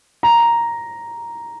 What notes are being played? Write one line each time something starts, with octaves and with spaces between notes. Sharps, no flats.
A#5